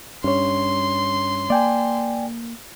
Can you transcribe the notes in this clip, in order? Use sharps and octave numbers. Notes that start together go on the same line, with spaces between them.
G2 C#4 C#5 C6
A#3 D5 G5 G#5